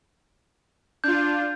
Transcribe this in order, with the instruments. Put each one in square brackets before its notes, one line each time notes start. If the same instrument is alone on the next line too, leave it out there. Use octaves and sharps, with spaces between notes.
[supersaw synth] D4 F4 [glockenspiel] G6